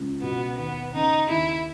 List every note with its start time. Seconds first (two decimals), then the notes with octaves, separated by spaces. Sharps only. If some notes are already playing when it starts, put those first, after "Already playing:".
Already playing: C#2
0.22 B2 B3
0.57 D#2 B3
0.94 C#3 D#4
1.29 D#2 E4